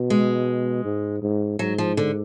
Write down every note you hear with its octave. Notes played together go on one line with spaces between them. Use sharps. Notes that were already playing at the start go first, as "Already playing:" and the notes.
Already playing: B2
G#3
G#2
G#2
G#2 F#3
F3
D3